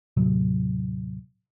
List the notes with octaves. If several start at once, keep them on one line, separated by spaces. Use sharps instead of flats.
D#2 A2 C3 F#3